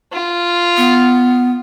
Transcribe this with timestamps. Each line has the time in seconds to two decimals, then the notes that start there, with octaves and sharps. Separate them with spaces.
0.12 F4
0.77 B3